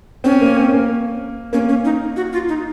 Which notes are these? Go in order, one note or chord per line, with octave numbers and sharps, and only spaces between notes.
C4 C#4
A#3
C4
A#3
A#3 C#4
C#4
D#4
F#4
F4
D#4